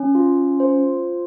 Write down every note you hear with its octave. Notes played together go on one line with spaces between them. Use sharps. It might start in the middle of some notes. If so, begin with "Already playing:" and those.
Already playing: C#4
F4
C5